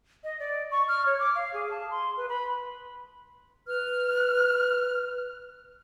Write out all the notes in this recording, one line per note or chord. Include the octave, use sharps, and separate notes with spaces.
D#5
D5
C#6
F6
C#5
D6
F5
G#4
A5
C6
B4
B5
B4 F6